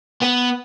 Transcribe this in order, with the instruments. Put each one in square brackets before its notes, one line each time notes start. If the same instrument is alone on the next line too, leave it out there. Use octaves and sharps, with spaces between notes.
[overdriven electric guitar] B3